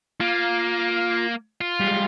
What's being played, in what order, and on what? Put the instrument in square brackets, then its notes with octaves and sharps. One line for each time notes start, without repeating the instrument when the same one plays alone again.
[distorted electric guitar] A#3 [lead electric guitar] F4
[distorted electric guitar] F4
[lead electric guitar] G3 G#3